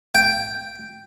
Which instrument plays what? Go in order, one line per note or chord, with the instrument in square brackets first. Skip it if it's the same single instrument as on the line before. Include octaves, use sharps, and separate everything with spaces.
[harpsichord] G5